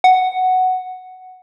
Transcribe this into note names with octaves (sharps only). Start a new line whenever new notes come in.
F#5